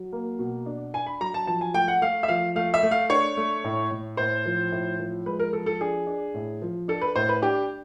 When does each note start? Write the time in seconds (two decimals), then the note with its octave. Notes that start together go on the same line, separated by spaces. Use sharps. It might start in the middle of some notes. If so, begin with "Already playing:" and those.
Already playing: F#3
0.13 A#3
0.39 B2
0.66 D4
0.94 D4 G#5
1.06 B5
1.21 F#3 A#5
1.34 A5
1.47 F3 A5
1.61 G#5
1.74 A3 G5
1.88 F#5
2.02 A3 F5
2.23 E5
2.28 F3 F5
2.56 A3 F5
2.74 E5
2.83 A3
2.91 F5
3.10 D4 C#5
3.37 A3
3.64 A2
3.91 A2
4.17 A2 C5
4.45 F3
4.72 A2
5.00 F3
5.26 G#3 B4
5.40 A#4
5.53 F3 A4
5.66 A4
5.81 D4 G#4
6.07 D4
6.34 A2
6.62 F3
6.88 D4 A4
7.01 B4
7.15 A2 C5
7.29 B4
7.42 D4 G4